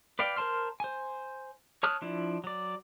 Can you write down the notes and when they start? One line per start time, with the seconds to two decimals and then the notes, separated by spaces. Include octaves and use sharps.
0.19 B4 D5 F5 G5
0.36 A#4 C5 A5 C6 F6
0.80 C5 G#5
1.83 C#5 A5 D#6 F6 F#6
2.02 F3 D4 E4
2.44 F#3 D5